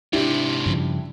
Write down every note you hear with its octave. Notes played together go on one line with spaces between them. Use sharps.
G#2 C3 D4 E4 G4
G2 C#3 F3